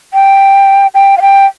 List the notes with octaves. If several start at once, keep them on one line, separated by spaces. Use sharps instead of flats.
G5
G5
F5
G5